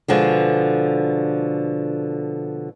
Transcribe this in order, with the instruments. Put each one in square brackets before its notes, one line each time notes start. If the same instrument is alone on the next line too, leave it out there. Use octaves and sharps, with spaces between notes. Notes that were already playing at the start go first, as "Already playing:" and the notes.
[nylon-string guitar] B2 D3 F3 G#3